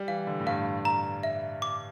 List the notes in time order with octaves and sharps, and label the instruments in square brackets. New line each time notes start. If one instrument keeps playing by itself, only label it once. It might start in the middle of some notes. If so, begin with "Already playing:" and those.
Already playing: [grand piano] G3
[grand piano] E3 [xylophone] F5
[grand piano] D3
A2
[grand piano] G2 [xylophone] F5
[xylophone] A#5
E5
D6